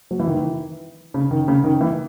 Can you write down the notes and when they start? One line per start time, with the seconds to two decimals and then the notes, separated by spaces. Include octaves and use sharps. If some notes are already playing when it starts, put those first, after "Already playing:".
0.11 F#3
0.20 E3
0.27 D#3
0.37 E3
1.14 C#3
1.31 D#3
1.48 C#3
1.64 D#3
1.81 E3